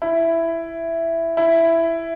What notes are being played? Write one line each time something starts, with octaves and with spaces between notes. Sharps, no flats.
E4
E4